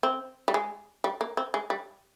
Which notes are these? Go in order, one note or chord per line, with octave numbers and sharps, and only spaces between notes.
C4
G3
G#3
G3
A#3
C4
G#3
G3